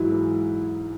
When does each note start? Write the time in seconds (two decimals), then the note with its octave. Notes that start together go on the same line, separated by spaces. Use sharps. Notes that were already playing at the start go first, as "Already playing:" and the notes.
Already playing: G#2 E3 F#3 G#3 E4
0.11 E3